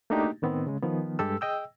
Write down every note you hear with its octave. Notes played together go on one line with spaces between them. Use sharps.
A3 A#3 D4 D#4 F#4 G4
A2 D#3 B3 C4
C#3 G#3
D#3 F3 B3
G2 G#3 G4 A4 E6
G#4 D#5 G5 E6